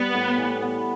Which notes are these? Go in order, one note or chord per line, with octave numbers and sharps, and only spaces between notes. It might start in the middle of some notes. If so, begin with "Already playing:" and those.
Already playing: G3 B3
A2
E3
B3